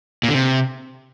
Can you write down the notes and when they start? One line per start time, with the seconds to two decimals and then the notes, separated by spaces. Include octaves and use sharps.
0.23 A#2
0.29 D3
0.34 C3